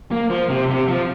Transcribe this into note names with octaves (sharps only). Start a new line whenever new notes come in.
A#3
F3
C3
C3
F3